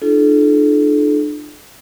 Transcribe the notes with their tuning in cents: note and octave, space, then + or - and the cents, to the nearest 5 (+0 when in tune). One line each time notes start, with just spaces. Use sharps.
D4 +35 F4 -30 A4 -35